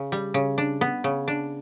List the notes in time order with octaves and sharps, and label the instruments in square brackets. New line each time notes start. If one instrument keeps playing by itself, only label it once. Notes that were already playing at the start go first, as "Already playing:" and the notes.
Already playing: [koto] C#3
G3
C#3
D4
B3
C#3
D4